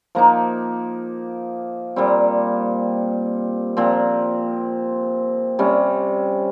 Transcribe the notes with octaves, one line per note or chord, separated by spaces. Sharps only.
F3 A#3 D#4
A#2 G3 C4
A#2 F3 C4
C3 G3 C#4